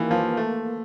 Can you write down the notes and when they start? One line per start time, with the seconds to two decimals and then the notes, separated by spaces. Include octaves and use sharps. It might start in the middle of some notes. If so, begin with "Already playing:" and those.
Already playing: D#3 E3 A#3
0.11 F3
0.37 A3